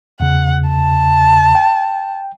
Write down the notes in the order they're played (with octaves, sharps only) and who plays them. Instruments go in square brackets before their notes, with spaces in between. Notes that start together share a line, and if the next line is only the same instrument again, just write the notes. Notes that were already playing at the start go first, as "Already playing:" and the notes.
[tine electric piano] E2 C#3 [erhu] F#5
[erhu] A5
[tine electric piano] G5